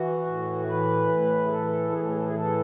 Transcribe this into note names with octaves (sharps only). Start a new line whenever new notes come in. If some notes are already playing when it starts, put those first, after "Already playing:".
Already playing: E3 F#4
A2
E3 B4
A2
G#4
E3 A4
A2 G#4
A4
G#4
A4
G#4
E3 A4